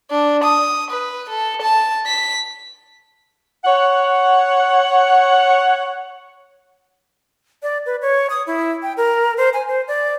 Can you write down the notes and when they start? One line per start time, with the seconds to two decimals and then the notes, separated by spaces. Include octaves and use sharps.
0.11 D4
0.43 D#6
0.90 B4
1.30 A4
1.62 A5
2.06 B6
3.65 C#5 F#5
7.63 D5
7.86 B4
8.02 C#5
8.30 D#6
8.47 E4
8.83 G5
8.97 A#4
9.38 C5
9.53 G#5
9.68 C5
9.88 D5